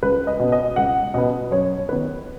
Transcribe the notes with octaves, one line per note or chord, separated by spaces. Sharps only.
C#2 B4
D#5
B2 B3
D#5
C#2 F#5
B2 B3 D#5
F#2 C#5
D#3 B3 B4